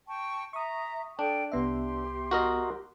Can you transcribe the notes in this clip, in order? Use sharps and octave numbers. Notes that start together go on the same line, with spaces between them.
G5 A5 C#6
E5 A#5 C#6 D#6
D4 A4 G5
C2 B3 G4 E5 C6
F#4 A#4 D#5